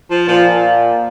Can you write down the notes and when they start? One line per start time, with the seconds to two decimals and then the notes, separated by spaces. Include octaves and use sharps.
0.11 F3
0.28 A#2 F3